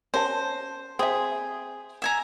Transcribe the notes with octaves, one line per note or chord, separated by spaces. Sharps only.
C#4 A#4 C5 A5
C4 G#4 E5
E5 G#5 A#5